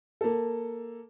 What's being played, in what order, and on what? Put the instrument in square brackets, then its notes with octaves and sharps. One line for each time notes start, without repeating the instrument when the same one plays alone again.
[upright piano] A#3 A4